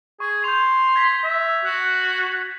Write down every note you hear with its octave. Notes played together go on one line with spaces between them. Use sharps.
G#4 C#6
C6 G6 F7
G#6 A#6 B6
E5
F#4 F#6
F#7